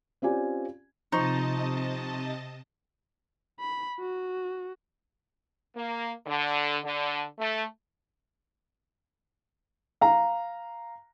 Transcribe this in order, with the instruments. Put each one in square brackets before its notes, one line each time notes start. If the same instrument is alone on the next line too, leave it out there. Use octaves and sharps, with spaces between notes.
[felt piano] C4 C#4 F4 G4 D5 G#5
[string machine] C3 D#5 A5 [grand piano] F3 C5 C#6 [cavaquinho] D#4
[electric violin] B5
F#4
[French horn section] A#3
D3
D3
A3
[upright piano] F5 A#5